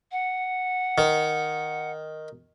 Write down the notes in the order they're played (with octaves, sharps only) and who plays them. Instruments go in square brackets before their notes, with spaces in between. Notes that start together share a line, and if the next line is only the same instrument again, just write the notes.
[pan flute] F#5
[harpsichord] D#3